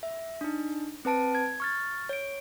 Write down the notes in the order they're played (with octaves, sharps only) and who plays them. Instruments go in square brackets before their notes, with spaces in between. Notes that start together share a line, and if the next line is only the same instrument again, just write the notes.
[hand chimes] E5
D4 D#4
C4 B4 A5 D7
G#6
C#6 F6 A6
C#5 D7